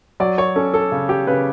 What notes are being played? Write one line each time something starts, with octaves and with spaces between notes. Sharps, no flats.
F#3 D5
C#5
C#4 A4
A4
C#3
G4
C#3 B4